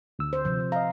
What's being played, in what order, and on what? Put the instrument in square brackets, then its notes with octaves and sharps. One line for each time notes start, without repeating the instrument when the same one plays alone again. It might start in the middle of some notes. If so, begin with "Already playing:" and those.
[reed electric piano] D2 E6
[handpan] C5
C3 F3
[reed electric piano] D#5 A#5 [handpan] F5